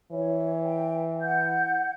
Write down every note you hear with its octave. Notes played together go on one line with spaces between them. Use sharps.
E3 C#5
G5
F#5 G6